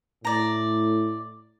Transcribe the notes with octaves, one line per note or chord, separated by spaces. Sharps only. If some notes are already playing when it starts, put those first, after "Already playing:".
A2 D5 A#5